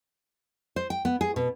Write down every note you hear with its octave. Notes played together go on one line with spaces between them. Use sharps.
C5
G5
B3
G#4
B2